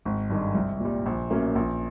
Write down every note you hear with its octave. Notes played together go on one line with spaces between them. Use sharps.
G#1
G2 D#3 G#3
C2
A#2
G3
A#1
A2 F#3 A#3 C#4
A#1